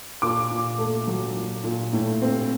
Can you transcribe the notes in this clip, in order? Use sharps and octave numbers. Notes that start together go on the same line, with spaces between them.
A#2 D6
A#2
A3
F#3
A#2
A#2
A2
C4